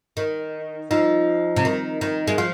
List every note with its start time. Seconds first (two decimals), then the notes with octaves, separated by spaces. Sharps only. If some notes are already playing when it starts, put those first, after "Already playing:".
0.17 D#3
0.91 F3 D#4 D#5
1.56 C3
1.65 D#3
2.01 D#3
2.27 G#3
2.38 F3 F4 F5